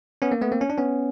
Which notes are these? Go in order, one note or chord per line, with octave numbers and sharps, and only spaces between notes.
B3 C#4
A#3
A3 B3
A#3 C4
C#4
D4
B3 C#4